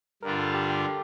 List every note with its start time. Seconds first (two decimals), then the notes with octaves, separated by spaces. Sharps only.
0.23 G2 D3 G3 D4 F4 A#4
0.39 A4
0.54 G4
0.70 G4